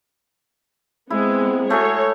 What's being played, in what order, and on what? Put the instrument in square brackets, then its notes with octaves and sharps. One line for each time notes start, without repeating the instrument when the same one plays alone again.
[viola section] G#3 B3 [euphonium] C4 [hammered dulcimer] E4
[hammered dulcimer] A3 F#4 G#4 [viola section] C#5